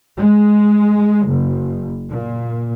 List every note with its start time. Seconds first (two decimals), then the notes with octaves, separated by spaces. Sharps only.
0.17 G#3
1.27 F#1
2.10 A#2